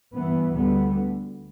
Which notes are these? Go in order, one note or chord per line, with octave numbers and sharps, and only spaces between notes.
G2 E3 B3
D2 D3 G3 B3